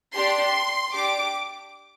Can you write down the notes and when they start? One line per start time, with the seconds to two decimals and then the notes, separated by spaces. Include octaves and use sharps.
0.14 D4 G4 C6
0.92 D4 G4 D6